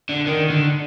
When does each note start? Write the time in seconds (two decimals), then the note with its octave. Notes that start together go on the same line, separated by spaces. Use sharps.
0.09 D3
0.26 D#3
0.50 D3